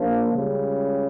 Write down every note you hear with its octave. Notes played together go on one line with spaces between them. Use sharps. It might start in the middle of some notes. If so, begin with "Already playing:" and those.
Already playing: A#1 A#2 F3
C#2 C#3 G3